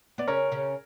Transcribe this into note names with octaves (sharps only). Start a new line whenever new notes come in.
B3 D5
C#3 C#4 A#4 C#5
C#3 C#4